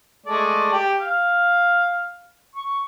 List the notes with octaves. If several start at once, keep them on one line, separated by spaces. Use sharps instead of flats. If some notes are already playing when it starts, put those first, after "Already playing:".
G#3 A3 D5
G4 G5
F5
C#6